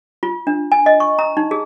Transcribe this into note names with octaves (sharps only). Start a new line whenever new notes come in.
F4
D4
G#5
D#5
C#6
A#5
D#4
G#4